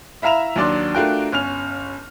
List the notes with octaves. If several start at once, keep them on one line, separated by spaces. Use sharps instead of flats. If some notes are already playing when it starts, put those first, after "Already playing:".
E4 E5 F5 A#5 E7 F7
D#2 F#3 D4 D5 C6
A3 D4 F4 F#4 A#4 G5
G1 C#4 F6 F7